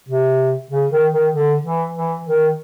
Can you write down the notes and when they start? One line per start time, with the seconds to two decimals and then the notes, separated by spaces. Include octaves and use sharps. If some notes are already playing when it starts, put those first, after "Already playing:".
0.09 C3
0.71 C#3
0.91 D#3
1.12 D#3
1.32 D3
1.64 E3
1.94 E3
2.25 D#3